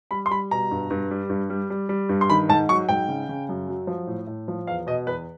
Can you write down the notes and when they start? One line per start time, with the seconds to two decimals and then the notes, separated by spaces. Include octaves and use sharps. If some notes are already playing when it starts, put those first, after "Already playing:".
0.11 G3 B5
0.26 C6
0.30 G3 B5
0.51 B2 A#5
0.71 G2
0.90 G2
1.11 G3
1.30 G2
1.50 G3
1.70 G3
1.89 G3
2.09 G2
2.21 C6
2.30 D#3 B5
2.49 G#2 A5
2.69 F#3 C#6
2.89 G#2 G5
3.08 C#3
3.29 C#3
3.49 F#2
3.68 F#3
3.87 F3
4.07 A2
4.27 A2
4.48 F3
4.67 E2 F5
4.87 B2 D#5
5.07 E2 B4